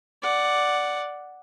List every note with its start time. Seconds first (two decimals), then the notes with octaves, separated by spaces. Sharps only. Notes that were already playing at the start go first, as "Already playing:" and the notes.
0.22 D5 F#5